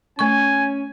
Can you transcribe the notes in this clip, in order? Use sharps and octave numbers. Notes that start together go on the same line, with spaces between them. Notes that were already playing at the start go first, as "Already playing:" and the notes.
A3 C#4 G#5 C#6